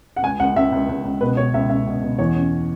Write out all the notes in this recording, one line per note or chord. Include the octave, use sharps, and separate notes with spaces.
F#5
C#2 G#5
C#2 F#5
C#2 E5
C#2
C#2
C#2
B2 B4
B2 C#5
C#2 E5
C#2 E5
B2
B2
E2 C#5
C#4